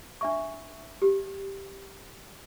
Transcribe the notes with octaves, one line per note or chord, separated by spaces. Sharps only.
D4 E5 C#6
G4